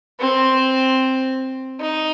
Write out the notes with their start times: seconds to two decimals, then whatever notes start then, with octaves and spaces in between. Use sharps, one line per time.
0.20 C4
1.80 D#4